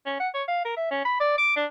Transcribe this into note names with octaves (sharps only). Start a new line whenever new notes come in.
C#4
F#5
C#5
F5
A#4
E5
C#4
B5
D5
D6
D4